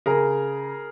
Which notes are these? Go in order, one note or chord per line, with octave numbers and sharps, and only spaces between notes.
C#3 G#4 A#4